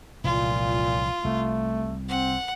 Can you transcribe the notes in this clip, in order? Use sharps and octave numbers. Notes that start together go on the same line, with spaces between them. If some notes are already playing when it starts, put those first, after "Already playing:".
F1 C2 A#2 E3 F4
C2 C3 A3
C4 F#5